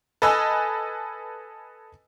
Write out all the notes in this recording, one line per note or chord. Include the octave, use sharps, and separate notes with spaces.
A4 B4 D#5 G#5 E6